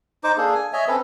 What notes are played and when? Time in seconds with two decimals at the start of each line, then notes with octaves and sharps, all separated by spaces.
0.24 D#4 C5 D6
0.37 A#3 D4 G#4 A4
0.55 G#5
0.73 C#5 D#5 E5 G#5
0.87 C4 C#4 A4 B4